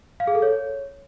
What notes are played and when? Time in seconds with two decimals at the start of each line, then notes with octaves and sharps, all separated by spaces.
0.20 F5
0.27 G#4
0.35 A4
0.42 C#5